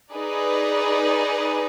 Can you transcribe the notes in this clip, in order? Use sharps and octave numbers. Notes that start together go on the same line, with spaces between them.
D#4 G#4 B4 D5